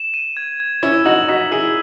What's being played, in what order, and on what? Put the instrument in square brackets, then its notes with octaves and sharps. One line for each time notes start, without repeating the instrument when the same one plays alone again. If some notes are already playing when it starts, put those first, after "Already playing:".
Already playing: [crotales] E7
D#7
G#6
G#6
[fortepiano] C#4 E4 [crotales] E6
[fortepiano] D#4 F#4 [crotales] F#7
[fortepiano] D#4 F#4 [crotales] B6
[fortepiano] E4 G#4 [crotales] E6